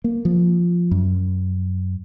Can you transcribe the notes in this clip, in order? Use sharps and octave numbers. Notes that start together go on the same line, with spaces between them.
A#3
F3
F#2